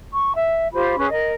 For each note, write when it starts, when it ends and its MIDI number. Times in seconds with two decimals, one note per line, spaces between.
0.13 0.34 85
0.35 0.68 76
0.73 0.97 65
0.73 0.97 67
0.73 0.97 72
0.73 0.97 83
0.98 1.07 61
0.98 1.07 68
0.98 1.07 71
1.10 1.32 70
1.10 1.32 75